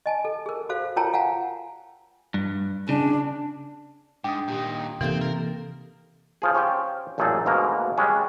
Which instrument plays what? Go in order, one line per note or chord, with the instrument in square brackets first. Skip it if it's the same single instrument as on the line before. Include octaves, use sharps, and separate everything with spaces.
[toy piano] D#5 G#5 A5
A4
G#4 A#4
F#4 A4 C5 F5
F4 A#4 C#5 G5 A5 A#5
F5 F#5 G#5 A#5
[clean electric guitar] G2
[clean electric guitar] C#3 [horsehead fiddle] D4
[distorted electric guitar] G#2 [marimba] D4 [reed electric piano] G5 D#6
[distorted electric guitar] A#2 D#3 [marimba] G4
[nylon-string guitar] C3 A#3 D#4 [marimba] E3 A4 G6 [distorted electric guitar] C4
[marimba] A4 [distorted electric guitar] A#4
[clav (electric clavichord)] C#3 F3 G#4
C#4 G4 C5 C#5 F5 G5
A1 F#2 A#2 D#4 G#4 A4
D2 G#2 B2 A#3 F5 A#5
G3 G#3 C#4